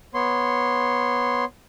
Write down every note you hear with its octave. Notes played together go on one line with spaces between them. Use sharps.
B3 C#5 C6